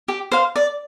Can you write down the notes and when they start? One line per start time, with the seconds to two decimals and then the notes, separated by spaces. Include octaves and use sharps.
0.08 G4
0.32 C5 F5
0.56 D5